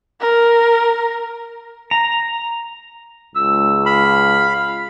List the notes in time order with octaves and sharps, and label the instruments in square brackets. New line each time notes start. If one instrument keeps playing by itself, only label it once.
[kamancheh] A#4
[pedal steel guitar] A#5
[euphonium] C#2 [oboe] E6
[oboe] F5 [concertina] B5